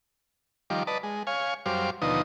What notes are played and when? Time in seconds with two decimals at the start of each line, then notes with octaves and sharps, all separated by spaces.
0.70 D#3 F3 G3 D6
0.87 B4 D5 D#5 A5
1.03 G#3
1.27 C#5 F5 G#5
1.66 F#2 G3 C5 F5 D6
2.02 D#2 B2 D3 F3 D#4 D#6